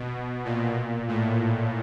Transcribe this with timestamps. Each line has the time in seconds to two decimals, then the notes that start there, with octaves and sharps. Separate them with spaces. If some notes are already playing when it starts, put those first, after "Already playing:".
Already playing: B2
0.45 A#2
1.08 A2